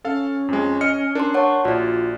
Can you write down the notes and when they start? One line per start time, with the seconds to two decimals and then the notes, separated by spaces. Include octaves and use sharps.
0.05 C#4 A4 F5
0.48 F2 G#3
0.81 D#5 F6 C#7
1.15 D4 A#4 C6
1.34 C#5 F#5 A5 C#6
1.65 A#1 F4 F#4 D5